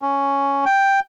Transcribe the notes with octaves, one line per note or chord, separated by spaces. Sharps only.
C#4
G5